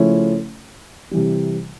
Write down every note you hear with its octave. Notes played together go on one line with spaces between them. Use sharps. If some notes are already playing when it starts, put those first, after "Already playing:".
Already playing: C#3 F3 A3 C#4 E4
C3 E3 G3